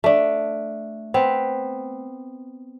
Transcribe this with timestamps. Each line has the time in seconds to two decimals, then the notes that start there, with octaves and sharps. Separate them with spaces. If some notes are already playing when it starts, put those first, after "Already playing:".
0.04 A3 D4
1.14 B3 C4 B4